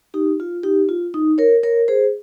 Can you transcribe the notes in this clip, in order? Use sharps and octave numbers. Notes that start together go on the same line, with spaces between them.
D#4 G4
F4
D#4 G4
F4
D#4
A#4 C#5
A#4 C#5
G#4 C5